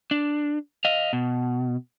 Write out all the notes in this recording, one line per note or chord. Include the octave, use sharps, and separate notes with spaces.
D4
D#5 F5
B2